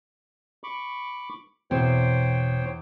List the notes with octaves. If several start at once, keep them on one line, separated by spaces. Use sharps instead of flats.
B5 C#6 D6
E2 B2 C4 C5 C#5 G5